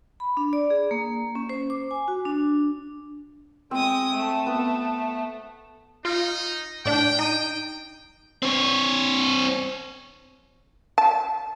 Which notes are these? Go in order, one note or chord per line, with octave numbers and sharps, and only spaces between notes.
B5
D4
D5
G#4
A#3
C#4
C5
D6
G#5
F#4
D4
G#3 C4 D#6
A3
B3
D#4 F4
A2 D4 G5
D#4 D#7
C4 C#5
A5